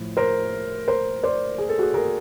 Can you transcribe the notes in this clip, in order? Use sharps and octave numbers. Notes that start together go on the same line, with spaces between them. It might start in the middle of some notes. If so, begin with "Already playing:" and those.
Already playing: A2 F3
A#4 C5
A#4 C5
C5 D5
G#4
A4
F#4 G#4
G#4 A#4